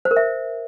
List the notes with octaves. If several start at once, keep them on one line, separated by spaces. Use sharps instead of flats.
C5
A#4
E5